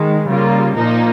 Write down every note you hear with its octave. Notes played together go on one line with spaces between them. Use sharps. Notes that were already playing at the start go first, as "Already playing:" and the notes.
Already playing: D#3 G#3
C#3 G3 A#3 F4
A#2 F3 A#3 D#4